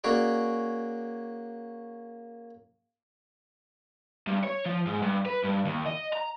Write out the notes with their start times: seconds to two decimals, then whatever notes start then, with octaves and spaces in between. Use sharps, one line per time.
0.04 A#3 C#4 F#4 G#4 C#5 D5
4.27 G2
4.44 C#5
4.66 F3
4.87 G#2
5.02 G2
5.26 B4
5.44 G2
5.66 D#2
5.87 D#5
6.13 A#5